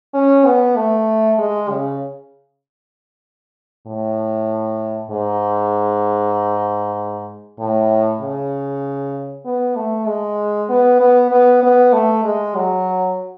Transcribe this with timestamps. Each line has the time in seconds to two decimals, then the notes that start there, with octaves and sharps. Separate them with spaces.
0.14 C#4
0.45 B3
0.76 A3
1.38 G#3
1.70 C#3
3.87 A2
5.11 G#2
7.59 A2
8.21 C#3
9.46 B3
9.76 A3
10.07 G#3
10.69 B3
11.00 B3
11.31 B3
11.63 B3
11.93 A3
12.24 G#3
12.55 F#3